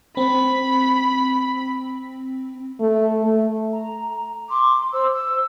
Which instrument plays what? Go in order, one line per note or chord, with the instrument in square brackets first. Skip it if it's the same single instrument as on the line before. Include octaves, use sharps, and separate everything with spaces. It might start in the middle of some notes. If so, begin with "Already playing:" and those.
[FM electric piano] C4 [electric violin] B5
[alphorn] A3
A3
[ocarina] A#5
[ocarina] C6 [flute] D6
[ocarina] C5 [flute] E6
[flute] E6